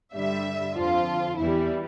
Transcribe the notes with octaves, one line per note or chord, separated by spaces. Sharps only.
G2 D3 G3 E5
F2 D3 F3 F4
E2 E3 G3 E4